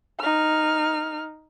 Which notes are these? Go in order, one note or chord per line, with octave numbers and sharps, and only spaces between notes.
D#4 F6